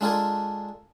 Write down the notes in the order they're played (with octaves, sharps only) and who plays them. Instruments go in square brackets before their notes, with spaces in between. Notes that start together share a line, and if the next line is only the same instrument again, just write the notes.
[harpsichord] G#3 D4 F4 A4 A#4 G#5